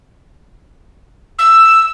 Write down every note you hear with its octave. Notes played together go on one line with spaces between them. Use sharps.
E6